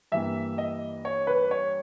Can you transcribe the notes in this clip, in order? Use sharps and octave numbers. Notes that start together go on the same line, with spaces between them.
G2 E3 G3 A#3 E5
D#5
C#5
B4
C#5